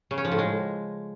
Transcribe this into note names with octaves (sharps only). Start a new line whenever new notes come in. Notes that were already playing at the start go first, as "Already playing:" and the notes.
C#3
C#4
F3
A2
G#3